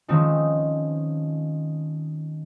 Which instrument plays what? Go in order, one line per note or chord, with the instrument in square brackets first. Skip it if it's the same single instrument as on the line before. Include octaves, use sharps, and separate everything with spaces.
[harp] D#3 F3 G#3 C4 C#4 D#4